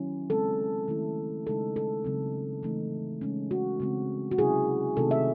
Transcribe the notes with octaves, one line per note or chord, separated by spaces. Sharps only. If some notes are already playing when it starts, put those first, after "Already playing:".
Already playing: D#3 F#3 C#4 E4
C#3 G#3 C4 A4
D#3 A3 C#4 E4
C#3 G#3 D#4 A4
A4
C#3 F#3 C4
E3 A3 D#4
C#3 G#3 C#4
F#4
C#3 G#3 C4
F#4
C3 F#3 C#4 E4 G#4
C3 D#3 A3 C4 D#4 A4
E5